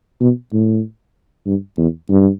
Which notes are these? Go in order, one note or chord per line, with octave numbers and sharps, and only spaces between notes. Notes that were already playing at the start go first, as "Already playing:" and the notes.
B2
A2
G2
E2
G2